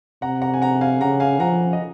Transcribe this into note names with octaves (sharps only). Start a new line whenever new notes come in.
C3 F#5 A#5
F#5 A#5
G#5
F#5 A#5
F5 G#5
C#3 F#5 A#5
F5 G#5
F3 F#5 A#5
D#5